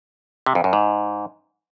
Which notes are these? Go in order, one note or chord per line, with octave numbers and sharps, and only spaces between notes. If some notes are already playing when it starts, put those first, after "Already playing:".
C3
F2
F#2
G#2